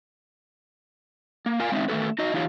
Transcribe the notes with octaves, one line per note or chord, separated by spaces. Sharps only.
A#3
F4 A#4 F5 G#5
G#3 C4 C#4 D#4 E5
D#3 A3 B3 A4 B4
D#4 F#4 D#5
E3 D#4 F4 G4 B4 C#5